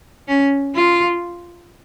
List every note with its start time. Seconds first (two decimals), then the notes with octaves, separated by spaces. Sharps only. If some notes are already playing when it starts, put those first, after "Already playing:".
0.28 C#4
0.75 F4